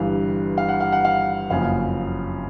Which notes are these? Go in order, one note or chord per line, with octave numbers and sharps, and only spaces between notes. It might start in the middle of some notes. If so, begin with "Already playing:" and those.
Already playing: G1 G2 E3 F5
F5
F#5
F5
F#5
F5
F#1 F2 C#3 F5